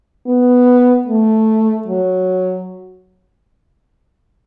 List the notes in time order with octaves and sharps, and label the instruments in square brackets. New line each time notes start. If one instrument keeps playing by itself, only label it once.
[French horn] B3
A3
F#3